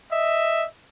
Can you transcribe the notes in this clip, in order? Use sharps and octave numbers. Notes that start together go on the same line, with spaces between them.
D#5 E5